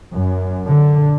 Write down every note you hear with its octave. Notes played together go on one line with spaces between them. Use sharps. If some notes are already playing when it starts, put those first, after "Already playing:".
F#2
D3